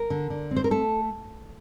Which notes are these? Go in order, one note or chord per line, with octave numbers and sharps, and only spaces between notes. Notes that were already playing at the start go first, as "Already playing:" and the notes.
Already playing: A#4
D3
D3
C4
C5
A#4
A3 A4